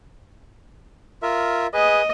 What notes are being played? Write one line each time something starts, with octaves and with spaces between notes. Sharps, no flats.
F4 A#4 E5
G#4 B4 D#5